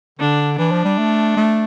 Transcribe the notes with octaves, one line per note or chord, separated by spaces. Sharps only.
D3 D4
E3 D4
F3
G3
A3
A3